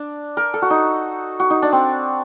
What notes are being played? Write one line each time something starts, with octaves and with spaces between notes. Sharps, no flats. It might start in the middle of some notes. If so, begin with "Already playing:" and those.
Already playing: D4
A#4
A4
F#4
D#4
F#4
D#4
D4
C4